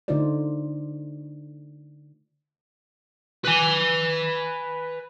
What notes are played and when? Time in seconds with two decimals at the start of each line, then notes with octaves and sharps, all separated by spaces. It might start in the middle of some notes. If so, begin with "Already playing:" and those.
0.08 D3 A3 D#4 F4 C5 D5
3.45 B4 G#5